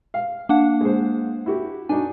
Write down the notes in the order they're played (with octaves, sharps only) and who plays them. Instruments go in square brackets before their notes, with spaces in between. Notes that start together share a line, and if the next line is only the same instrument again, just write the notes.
[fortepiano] F5
[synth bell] A#3 D4 F#5
[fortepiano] G#3 C5
E4 F#4 G4
[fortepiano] D4 D#4 F#4 [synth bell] G#5